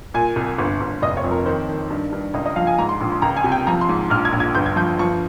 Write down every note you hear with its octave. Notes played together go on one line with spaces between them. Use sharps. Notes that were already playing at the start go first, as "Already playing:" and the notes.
A#2 G#5
C2
G1
G1
F1 D#5
C#5
F2
A#4
D#3 C5
D#3
G2
G2
C#2 D#5
D#5
F3 F5
G#5
G#2 A#5
C6
A#1 C6
C6
C#2 A#5
G#5
C3
G5
F3 A#5
C6
G#2
A#1 F6
G#6
A#1
G#6
G1 G6
G#6
F3 G6
F3 C#6